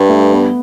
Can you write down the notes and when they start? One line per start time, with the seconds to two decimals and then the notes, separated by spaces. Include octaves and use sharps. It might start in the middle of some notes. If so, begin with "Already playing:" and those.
Already playing: G2 B4 E5
0.09 A3
0.31 B3